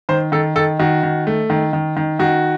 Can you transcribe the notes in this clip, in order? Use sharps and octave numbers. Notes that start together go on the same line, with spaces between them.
D#3 C5
D#3 A4
D#3 A4
D#3 F#4
D#3
A3
D#3
D#3
D#3
D#3 F#4